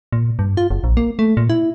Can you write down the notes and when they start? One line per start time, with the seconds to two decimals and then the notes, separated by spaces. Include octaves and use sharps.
0.13 A#2
0.39 G2
0.57 F4
0.70 F#1
0.84 A#1
0.97 A#3
1.19 A3
1.37 A#2
1.50 E4